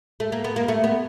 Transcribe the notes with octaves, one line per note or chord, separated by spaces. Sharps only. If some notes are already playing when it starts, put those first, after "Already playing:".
A3
A#3
B3
A#3
A3
B3